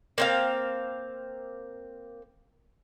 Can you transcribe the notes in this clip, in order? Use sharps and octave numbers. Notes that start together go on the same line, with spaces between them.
A#3 C4 F5